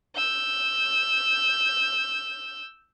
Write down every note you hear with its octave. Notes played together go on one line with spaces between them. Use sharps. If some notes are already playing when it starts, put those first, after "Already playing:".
E6 G6